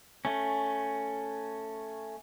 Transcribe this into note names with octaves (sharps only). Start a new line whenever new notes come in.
A3 C#4